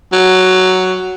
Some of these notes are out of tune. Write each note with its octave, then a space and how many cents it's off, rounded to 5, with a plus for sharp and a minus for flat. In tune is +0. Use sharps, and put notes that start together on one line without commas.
F#3 +5